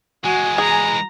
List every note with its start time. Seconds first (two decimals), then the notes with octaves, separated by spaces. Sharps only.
0.24 E3 G#3 F#4 G#5
0.58 G#4 A#5